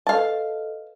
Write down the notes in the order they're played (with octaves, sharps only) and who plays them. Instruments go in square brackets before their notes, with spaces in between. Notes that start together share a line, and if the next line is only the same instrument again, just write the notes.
[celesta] A4 B4 D#5 [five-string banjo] F5 A5